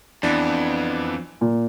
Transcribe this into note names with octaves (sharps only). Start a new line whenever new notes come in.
F2 E3 B3 D4
A#2